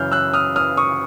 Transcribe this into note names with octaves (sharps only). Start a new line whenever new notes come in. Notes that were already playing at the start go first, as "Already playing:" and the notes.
Already playing: F#2 C#3 E3 F6 G6
E6 F#6
D#6 F6
D#6 F6
C#6 D#6